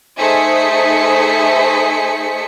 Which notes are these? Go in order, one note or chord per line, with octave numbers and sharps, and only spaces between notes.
A3 D#4 G#4 C5 B6 C#7